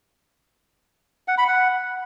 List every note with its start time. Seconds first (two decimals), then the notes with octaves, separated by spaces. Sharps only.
1.28 F#5
1.38 B5
1.48 F#5